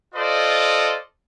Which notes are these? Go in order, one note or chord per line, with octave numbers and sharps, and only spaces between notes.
F4 A4 C5 D5 D#5